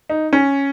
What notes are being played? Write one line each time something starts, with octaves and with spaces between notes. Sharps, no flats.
D#4
C#4